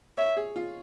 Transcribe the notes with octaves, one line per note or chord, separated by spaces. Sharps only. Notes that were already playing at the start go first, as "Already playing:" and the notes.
C#5 E5
G#4
F4